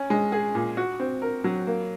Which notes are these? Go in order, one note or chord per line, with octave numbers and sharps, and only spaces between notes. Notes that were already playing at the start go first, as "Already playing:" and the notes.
Already playing: C#4
G#3
G#4
A#2
F#4
C4
A#4
F#3
A#3